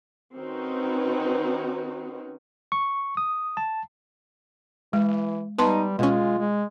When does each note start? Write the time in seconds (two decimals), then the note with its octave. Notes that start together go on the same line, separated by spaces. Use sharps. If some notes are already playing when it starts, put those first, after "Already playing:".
0.37 D#3 C4 C#4 D#4 F#4 B4
2.72 C#6
3.17 D#6
3.57 A5
4.93 E3 G#3
5.59 G3 B3 D#4 B4 A5 C6
5.99 B2 G#3 C#4 F4
6.38 G#3